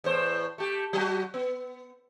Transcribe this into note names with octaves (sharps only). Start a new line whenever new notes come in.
E2 A2 C5
A3 G4
F#3 F#4
B3